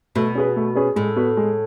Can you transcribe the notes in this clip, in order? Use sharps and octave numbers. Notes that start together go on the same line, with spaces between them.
B2 A3
C#4 G#4 B4
A3
C#4 G#4 B4
A2 G#3
B3 F#4 B4
G#3